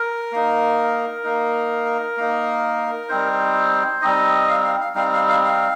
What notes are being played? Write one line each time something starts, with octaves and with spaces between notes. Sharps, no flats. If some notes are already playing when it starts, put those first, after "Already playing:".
Already playing: A#4
A#3 D#4
A#3 D#4
A#3 D#4
G3 C4 D#4 C5
G3 C4 D#4 D#5
F5
F5
F5
G3 C4 D#4 F5
F5
F5
F5